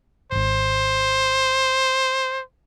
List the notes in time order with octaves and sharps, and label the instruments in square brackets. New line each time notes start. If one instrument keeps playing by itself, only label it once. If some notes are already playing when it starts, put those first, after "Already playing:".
[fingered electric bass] D1 G#1 [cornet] C5